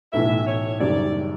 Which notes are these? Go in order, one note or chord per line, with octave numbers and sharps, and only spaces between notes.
B1 A2 E3 E5
C#5
F#1 F#2 D#3 G3 D5